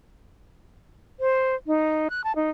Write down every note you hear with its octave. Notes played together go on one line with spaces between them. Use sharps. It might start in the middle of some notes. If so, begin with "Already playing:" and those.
C5
D#4
F#6
A5
D#4